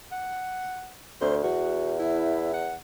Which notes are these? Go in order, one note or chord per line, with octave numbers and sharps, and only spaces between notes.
F#5
D2 C5
E2 F#4
E4
F#5